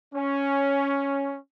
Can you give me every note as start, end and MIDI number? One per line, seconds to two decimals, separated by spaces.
0.14 1.35 61